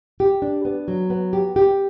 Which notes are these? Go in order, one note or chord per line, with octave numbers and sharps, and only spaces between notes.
G4
D4
B3
F#3
B3
G4
G4